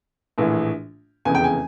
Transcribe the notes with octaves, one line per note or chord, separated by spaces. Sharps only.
A#1 A2 E3
F1 E2 C#3 G#5
G5
G#5